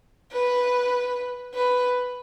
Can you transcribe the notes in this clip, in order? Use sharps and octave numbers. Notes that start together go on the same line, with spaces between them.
B4
B4